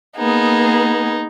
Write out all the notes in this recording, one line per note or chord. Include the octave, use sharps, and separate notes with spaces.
A#3 B3 D#4 G#4